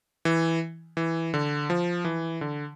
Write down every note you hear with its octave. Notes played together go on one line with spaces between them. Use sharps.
E3
E3
D3
F3
E3
D3